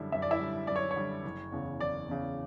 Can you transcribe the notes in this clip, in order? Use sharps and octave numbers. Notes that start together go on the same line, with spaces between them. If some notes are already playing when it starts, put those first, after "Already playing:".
Already playing: F#2 D3 G3 E4
F#2 E5
D5
E4 E5
D3 G3
F#2 D5
C#5
C#5
D3 G3
F#1
E2 C#3
F#1 D5
E2 C#3